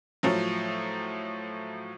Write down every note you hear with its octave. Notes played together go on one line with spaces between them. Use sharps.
A2 F3 F#3